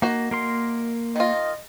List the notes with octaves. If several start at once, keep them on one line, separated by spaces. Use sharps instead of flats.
A#3 D#4 F#4 A#5
A#3 A#4 C6
D#3 F4 D#5